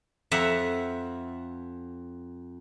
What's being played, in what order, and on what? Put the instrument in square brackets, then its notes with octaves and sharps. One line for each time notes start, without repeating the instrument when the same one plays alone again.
[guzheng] F2 E5 F#5 A#5